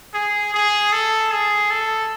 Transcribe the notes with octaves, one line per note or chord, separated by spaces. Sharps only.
G#4
G#4
A4
G#4
A4